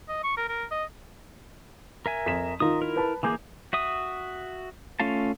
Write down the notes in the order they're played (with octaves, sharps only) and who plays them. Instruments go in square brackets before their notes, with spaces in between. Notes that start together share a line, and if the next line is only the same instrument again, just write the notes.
[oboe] D#5
C#6
A#4
A#4
D#5
[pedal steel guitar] A#4 E5 G#5
[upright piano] F2 B6 E7
[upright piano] D#3 D#4 F4 [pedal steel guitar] A#4 D#6
[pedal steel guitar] E4 A#4
[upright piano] B4 A5
[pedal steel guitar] E3 A#3 G#4 [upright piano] G#5 D6 G6
[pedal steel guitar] F#4 E5 D#6
A3 C#4 F4 F5 A5